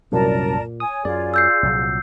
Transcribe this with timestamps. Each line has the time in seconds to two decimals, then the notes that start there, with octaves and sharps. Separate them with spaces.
0.12 C2 F#2 A#2 F#3 A#4 D5 A5
0.80 C#5 G#5 D#6
1.05 F#2 F4 G#4 D5
1.34 E6 G6 C7
1.63 C2 A#2 F#3